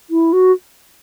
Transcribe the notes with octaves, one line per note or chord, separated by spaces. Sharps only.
E4
F#4